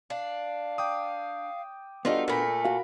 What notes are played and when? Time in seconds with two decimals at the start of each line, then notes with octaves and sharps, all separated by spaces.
0.10 D4 F5
0.78 G5 D6 D#6
2.05 G3 B3 D4 D#4 F4 F#4 A4
2.28 A#2 A3 A#4 B5 B6
2.65 F#4 F5